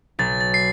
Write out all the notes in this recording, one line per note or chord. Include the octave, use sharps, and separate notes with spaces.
B1 A6
A6
C7